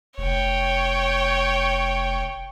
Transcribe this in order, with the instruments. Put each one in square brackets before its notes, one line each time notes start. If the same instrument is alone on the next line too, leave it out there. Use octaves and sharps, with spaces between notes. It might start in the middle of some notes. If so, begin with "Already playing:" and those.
[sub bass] F1 [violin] C#5 G5